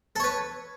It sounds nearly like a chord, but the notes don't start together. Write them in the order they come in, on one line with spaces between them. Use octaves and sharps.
A4 C#5 B4